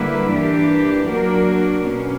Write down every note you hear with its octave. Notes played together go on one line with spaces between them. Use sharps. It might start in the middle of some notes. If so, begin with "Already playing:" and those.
Already playing: D3 G3 A#3 E4 B4
G2 E3 A#3 D4 G4
F#3 A#3 D4 F#4 A#4
B2 A#3 C#4